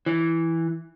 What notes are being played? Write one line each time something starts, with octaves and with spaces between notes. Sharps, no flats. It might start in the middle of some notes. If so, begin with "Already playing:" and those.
E3